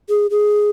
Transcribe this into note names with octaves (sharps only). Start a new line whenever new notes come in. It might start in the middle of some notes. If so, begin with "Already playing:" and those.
G#4
G#4